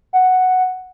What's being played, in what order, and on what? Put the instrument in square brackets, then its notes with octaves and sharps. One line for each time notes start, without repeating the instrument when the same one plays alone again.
[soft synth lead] F#5